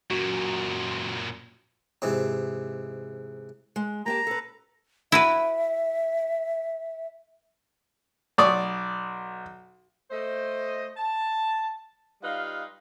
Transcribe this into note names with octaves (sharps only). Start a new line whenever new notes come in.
F#2 A#2 F#4
G#2 C3 E3
G#3
A#3 G4 A5 A#5
A4 B4
E4 F#4 B4 E5
B1 D5 C#6 D#6
A3 C5 D#5
A5
G3 D#4 F4 B4 F5